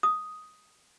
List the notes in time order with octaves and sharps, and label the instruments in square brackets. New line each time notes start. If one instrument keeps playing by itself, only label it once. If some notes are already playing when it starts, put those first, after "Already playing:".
[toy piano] D#6